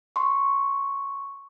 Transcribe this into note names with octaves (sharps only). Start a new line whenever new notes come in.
C6 C#6